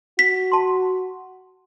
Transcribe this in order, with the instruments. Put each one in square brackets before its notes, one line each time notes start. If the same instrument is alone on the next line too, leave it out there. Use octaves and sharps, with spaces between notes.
[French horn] F#4 [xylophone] B6
[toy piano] A5 C6